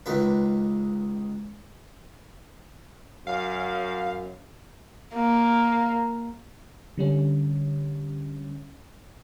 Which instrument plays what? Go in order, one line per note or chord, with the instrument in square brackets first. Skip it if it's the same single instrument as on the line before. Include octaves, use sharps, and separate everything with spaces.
[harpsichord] C#2 D#3 B4
[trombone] F#2 [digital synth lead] F5
[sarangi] A#3
[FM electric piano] D3 G3 C#4